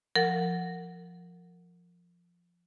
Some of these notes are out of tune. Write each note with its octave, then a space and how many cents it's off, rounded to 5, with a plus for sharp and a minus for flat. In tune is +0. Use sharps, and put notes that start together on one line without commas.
F3 +0 A#4 -25 F#5 +0